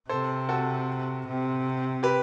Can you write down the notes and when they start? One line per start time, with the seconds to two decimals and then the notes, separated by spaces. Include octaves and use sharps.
0.09 C3 A4 C5
0.49 F#4 A4
1.27 C3
2.03 G4 B4